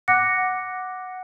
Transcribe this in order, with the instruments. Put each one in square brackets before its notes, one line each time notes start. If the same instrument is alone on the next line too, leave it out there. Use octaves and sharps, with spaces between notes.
[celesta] F#5 D6 F#6 A#6 C#7